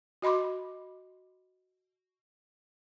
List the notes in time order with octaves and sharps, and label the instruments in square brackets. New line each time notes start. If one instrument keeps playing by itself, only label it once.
[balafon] F#4 D#5 B5 C6 D6